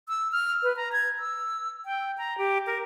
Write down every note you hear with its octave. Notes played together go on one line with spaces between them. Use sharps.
E6
F6
B4
A#5
G#6
E6
G5
A#5
G4
A#4